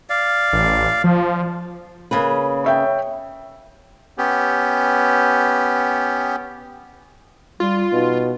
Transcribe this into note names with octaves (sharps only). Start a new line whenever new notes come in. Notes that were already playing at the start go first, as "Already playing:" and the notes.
D5 F5
A1
F3
C#3 A#3 B4
C#5 E5 G5
B3 C#4 G4
G3 F4
B2 D#4